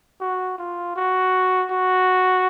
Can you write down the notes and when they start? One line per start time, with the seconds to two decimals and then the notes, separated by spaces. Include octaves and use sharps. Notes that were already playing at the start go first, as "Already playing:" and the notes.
0.21 F#4
0.58 F4
0.96 F#4
1.71 F#4